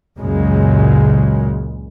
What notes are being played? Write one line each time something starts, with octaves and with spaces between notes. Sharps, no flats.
C#2 F#2 A#2 C#3 G#3